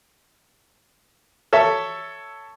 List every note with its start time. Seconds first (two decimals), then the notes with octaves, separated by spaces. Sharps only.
1.53 A4 C#5 E5